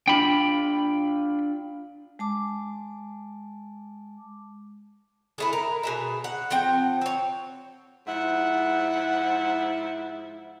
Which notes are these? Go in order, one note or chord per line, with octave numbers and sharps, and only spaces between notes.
D4 F4 G5 B5
G#3 A5 D6
G#3 A3 E4
A#4
B2 G#4 E5
F#5
F3 C4 F#5 G5
C4 C#5
G#2 F3 E4 F#5